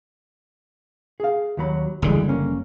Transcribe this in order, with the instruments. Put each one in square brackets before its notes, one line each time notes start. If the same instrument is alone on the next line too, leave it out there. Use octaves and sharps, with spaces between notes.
[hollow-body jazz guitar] G#4 F5
D#2 F#3 B5
[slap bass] F#1 D3 G3 [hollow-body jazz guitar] D2 E3 G#3
[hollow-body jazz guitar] A#3 C#4